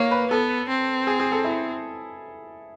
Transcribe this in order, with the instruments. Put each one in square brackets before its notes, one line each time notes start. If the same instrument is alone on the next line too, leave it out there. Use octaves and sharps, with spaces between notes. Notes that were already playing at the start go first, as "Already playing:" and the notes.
Already playing: [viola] A#3 [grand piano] C#5
[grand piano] B4
[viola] B3 [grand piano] A4
[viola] C4
[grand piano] G#4
G#4
A4
E4